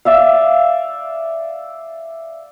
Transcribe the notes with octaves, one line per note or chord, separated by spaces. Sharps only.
D5 E5 F5